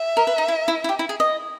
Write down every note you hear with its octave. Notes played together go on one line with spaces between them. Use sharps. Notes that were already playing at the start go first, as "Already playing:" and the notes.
Already playing: E5
A#4
B4
D#4
E4
E4
E4
G4
E4
G#4
D#5